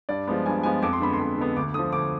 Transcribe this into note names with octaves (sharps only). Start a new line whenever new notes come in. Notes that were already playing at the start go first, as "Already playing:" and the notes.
G2 D5
F3 G#3 B3
G2 G#5
F3 G#3 B3 G#5
F2 D6
C6
D3 G#3 B3 B5
C6
F2
D3 G#3 B3
D2 D6
D3 F3 D#6
D2 D6